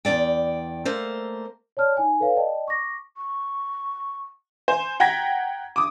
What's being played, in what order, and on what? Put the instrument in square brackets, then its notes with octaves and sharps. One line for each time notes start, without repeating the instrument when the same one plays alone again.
[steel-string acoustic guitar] E2 D#3 D5 G5
A3 A#3 C5
[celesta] C#5 D5 A5 F6
D#4 G#5
A4 B4 C#5 F5
D5 D#5 G5 A5
C#6 D6 A#6
[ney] C#6
[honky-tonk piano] C5 G#5
F#5 G5 A#5 G#6 A#6 B6
D6 D#6